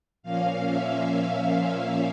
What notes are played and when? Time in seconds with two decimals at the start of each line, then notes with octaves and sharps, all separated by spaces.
0.23 A#2 F3 A#3 C#4 F5
0.65 E5
1.51 E5